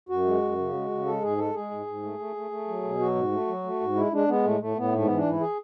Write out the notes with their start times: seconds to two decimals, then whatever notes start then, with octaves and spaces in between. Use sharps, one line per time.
0.09 F#2 F#4
0.25 G#3
0.42 F#2
0.58 C#3
0.73 G#3
0.90 C#3
1.06 G#3 A4
1.22 G#2 G#4
1.38 G#3 A4
1.54 G#3 G#4
1.71 G#2
1.87 G#2
2.03 A3
2.19 A3
2.36 A3
2.51 A3
2.68 F#3
2.83 B2
2.99 F#3 F#4
3.15 G#2
3.32 A3
3.47 F#3
3.64 A3
3.81 G#2
3.96 G#3 E4
4.12 G#3 D4
4.28 G#3 B3
4.45 A2 A3
4.60 A2 A3
4.77 A2 B3
4.93 G#2 A3
5.05 E3 B3
5.17 D4
5.25 G#2 E4
5.41 G#4